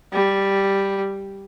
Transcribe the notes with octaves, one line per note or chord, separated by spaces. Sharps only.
G3